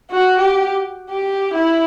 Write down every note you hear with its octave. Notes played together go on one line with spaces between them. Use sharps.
F#4
G4
G4
E4